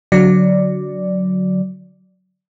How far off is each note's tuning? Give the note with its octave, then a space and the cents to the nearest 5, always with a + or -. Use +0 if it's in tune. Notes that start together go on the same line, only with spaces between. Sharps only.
D3 -15 F#3 +0 D5 +0